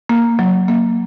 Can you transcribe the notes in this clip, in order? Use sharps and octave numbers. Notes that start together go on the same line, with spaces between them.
A#3
F#3
A#3